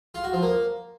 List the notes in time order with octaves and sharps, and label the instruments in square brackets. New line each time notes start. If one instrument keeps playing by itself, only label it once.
[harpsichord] F4
F#4
F3
A#3